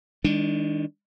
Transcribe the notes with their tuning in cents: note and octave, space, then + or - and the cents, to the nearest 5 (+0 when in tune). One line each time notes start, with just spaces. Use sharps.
D#3 +25 G#3 -30 D4 +0